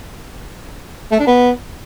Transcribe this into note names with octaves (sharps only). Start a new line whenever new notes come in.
A3
D4
B3